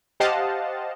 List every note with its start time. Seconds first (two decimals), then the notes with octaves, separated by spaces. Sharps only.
0.20 G4 C5 D#5 F5 F#5 A5